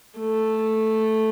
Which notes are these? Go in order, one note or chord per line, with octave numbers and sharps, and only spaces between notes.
A3